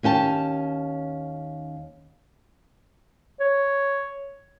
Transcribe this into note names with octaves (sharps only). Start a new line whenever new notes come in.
D#2 C#4 G5 A5
C#5